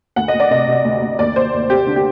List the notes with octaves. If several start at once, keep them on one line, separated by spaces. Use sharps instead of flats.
D2 F#5
D#5
D2
D5
C3 D#5
C3
D2
D2
D#2 D5
D#2 C5
D#2
C4 G4
D3
G4